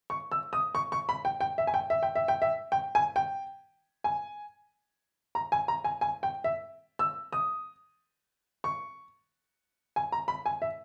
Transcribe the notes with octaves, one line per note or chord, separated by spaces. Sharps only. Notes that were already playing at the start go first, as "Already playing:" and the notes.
C#6
E6
D#6
C#6
C#6
B5
G5
G5
E5
G#5
G5
E5
G5
E5
G5
E5
G5
G#5
G5
G#5
A#5
G#5
A#5
G#5
G#5
G5
E5
E6
D#6
C#6
G#5
A#5
B5
G#5
E5